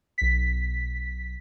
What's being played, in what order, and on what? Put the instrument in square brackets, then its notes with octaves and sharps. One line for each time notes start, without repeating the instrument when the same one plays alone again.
[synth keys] B1 B6